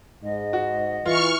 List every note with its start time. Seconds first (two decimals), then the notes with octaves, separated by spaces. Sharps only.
0.24 G#2 D#5
0.53 F#4
1.06 E3 F4 C#6 F6